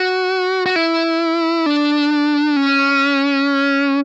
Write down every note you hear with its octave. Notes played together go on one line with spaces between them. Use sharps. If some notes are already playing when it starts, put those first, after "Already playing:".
Already playing: F#4
F#4
E4
D4
C#4